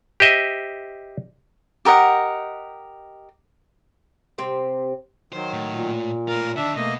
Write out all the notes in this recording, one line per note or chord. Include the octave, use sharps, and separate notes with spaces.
G4 C5 D#5 E5
G4 A#4 D#5 F#5
C3 C4
D#3 F#3 C5
A2
A#2
A2 F4 A#4
D3 D#3 D4 E5
B2 A3 A#3 D#5